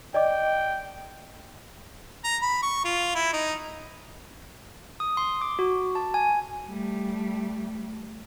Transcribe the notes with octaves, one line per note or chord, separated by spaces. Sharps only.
D5 D#5 G5 D6
A#5
B5
C#6
F4
E4
D#4
D#6
C6
D6
F#4
A5
G#5
G3 A3